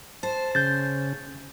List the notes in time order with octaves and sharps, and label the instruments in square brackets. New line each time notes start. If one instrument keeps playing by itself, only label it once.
[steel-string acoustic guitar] C5 [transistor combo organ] A5
[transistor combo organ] C#3 [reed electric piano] G6 A6